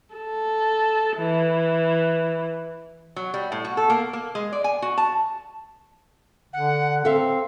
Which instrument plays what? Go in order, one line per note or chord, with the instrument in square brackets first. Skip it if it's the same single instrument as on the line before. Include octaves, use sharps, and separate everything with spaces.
[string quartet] A4
E3
[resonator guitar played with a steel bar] F#3
G3
A2
F#4
A4
A#3
A#3
G#3
D5
G#5
F#4
A5
[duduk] D3 [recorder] F#5
[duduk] C4 [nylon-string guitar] A4 E5 [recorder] F5